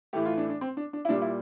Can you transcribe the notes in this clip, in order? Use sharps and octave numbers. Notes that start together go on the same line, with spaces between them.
A2 E3 A3 G4
F4
D4
D4
C4
D4
D4
E4
A#2 G3 D4
E4